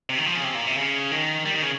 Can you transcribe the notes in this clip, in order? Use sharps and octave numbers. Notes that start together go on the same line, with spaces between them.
C3
D#3
F3
C#3
C3
A#2
C3
C#3
D#3
G3
D#3
C#3